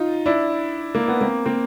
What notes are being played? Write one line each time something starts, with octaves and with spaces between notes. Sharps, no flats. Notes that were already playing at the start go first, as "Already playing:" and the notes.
Already playing: D#4 F4
D4 E4
A#3
B3
A#3 C4
A#3 C4